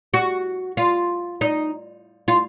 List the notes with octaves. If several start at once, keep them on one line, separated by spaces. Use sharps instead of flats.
F#4
F4
D#4
F4